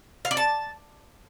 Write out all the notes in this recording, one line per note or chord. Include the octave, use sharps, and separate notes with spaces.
F5
D5
A5